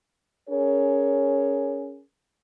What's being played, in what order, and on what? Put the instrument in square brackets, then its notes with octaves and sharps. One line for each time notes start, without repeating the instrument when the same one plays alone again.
[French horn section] C#4 G#4 A#4 C#5